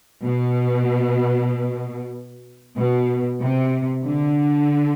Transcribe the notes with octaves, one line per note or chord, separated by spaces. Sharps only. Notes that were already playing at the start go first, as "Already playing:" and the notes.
B2
B2
C3
D3